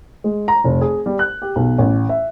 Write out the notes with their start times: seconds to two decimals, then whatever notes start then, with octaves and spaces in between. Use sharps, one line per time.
0.24 G#3
0.48 A#5
0.64 F1
0.81 G#4
1.06 G3
1.19 F#6
1.42 G4
1.56 B1
1.78 A1
2.09 E5